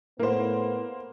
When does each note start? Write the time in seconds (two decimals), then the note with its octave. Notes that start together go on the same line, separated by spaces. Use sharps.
0.19 A2 A#3 B3 C5